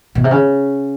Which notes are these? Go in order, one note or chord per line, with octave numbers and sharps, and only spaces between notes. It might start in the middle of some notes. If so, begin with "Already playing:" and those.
B2
C3
C#3